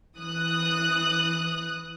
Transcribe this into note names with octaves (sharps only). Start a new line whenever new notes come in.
E3 D#6 F#6